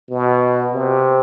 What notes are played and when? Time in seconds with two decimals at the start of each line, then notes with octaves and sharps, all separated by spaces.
0.10 B2
0.73 C3